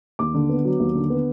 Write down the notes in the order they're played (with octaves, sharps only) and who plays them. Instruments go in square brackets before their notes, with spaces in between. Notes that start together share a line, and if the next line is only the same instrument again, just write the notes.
[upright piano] D#2 D6
D3
B3
F#3
D#2
D3
B3